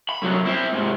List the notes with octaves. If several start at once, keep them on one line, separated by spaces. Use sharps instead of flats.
B5
C2 F#3
C4 E4
G#2 C3